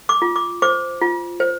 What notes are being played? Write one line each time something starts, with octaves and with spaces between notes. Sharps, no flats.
D6
F4
D6
C5 D6
F4
C5